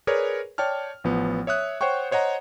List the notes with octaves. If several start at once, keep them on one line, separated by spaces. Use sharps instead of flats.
G#4 A#4 B4 C#5 D5
C#5 D5 G5 A5 F6
A1 F3 B3
C#5 E5 D#6 F#6
C5 C#5 F#5 G5 C#6
C5 C#5 D#5 F#5 A#5